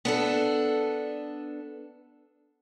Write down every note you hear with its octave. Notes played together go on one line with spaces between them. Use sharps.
B3 D4 A4